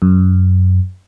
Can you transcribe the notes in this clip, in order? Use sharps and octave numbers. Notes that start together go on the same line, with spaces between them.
F#2